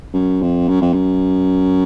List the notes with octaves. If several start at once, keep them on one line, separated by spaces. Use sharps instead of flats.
F#2
F2
F#2
F2
F#2